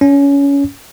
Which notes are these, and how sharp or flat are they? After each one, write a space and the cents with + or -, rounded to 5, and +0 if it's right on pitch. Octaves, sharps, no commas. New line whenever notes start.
C#4 +20